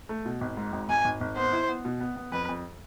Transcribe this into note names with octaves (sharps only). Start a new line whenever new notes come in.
A3
B2
G#1
G#2
G#1
G#1 G#5
G#1
G#1
B3 C5
E4
B3
B2
B3
B3
F2 B4
F2